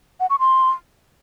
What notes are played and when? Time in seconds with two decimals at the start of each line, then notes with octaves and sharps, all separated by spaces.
0.20 F#5
0.30 C#6
0.39 C6